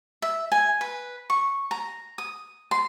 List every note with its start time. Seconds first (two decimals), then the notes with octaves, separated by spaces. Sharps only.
0.22 E5
0.52 G#5
0.81 B4
1.30 C#6
1.71 A#5
2.18 D#6
2.71 C6